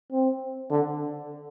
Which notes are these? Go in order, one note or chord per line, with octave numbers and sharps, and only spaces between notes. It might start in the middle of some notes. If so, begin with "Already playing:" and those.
C4
D3